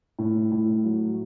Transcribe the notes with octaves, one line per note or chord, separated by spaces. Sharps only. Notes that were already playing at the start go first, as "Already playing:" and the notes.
A2
A2
F#3